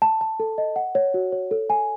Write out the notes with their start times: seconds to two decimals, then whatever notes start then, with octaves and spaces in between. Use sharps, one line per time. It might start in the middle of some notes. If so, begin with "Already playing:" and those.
0.02 A5
0.21 A5
0.40 A4
0.58 D#5
0.76 F#5
0.95 C#5
1.14 F#4
1.32 C#5
1.51 A4
1.70 G#5